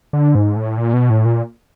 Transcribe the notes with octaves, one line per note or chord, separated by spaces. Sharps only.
D3
G#2
A2
A#2
B2
A2
A#2